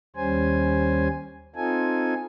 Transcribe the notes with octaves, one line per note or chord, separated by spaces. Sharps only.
D#2 G3 C#4 C5 G#5
C4 D#4 F4 A4 G#5